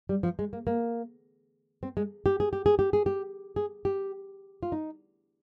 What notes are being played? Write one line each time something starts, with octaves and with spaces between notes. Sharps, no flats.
G3
F3
G#3
A#3
A#3
C4
G#3
G4
G#4
G4
G#4
G4
G#4
G4
G#4
G4
F4
D#4